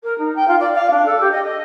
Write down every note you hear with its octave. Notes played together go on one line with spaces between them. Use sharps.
A#4
D#4
G5
F4
D5
F5
D4
A4
G4
D#5
D#5